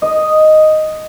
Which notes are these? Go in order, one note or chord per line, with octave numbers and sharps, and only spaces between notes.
D#5